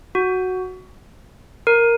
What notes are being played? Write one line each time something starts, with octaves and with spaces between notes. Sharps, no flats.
F#4
A#4